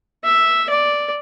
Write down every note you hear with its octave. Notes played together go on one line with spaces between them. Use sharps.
E5
D5